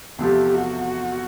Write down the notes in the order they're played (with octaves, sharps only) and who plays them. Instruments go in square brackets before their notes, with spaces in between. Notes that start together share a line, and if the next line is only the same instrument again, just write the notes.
[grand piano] E2 C3 F3 A3 [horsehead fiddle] G4
[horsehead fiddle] F#4